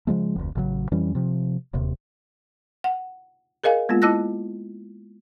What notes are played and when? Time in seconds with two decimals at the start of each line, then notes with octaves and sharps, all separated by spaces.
0.07 C#3 F3 G#3 A3
0.36 F1 D2
0.55 A1 C#3 E3 F#3
0.91 F2 E3 G3 C#4
1.15 C3 F3
1.73 D1 D#2 C3
2.84 F#5
3.64 G#4 A#4 D#5 F5 G#5
3.89 G#3 A#3 B3 F4
4.02 E4 D#5 A5 E6 F#6 A#6